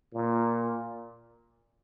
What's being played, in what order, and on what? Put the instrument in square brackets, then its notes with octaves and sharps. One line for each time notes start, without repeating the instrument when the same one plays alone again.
[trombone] A#2